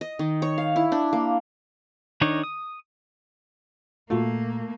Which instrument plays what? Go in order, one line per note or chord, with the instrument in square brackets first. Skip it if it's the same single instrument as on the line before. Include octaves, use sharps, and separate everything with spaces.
[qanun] D#5
D#3
C#5
F5
E4
D4
A#3
[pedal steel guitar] D#3 D4 D#4 C#5
D#6
[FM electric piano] A#2 F4 F#4 [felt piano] A3 [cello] A#3